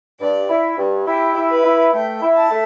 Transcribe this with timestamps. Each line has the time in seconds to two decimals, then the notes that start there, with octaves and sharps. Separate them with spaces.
0.19 G2 D5
0.49 E4
0.77 G2
1.06 E4 G4
1.35 E4
1.49 B4
1.64 E4
1.93 A3 G5
2.21 E4
2.35 A5
2.51 A3